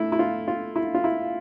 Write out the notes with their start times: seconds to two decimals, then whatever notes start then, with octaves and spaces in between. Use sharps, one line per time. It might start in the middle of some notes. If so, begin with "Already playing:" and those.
Already playing: A3 E4
0.12 E4
0.19 F4
0.48 F4
0.76 E4
0.94 F4
1.04 E4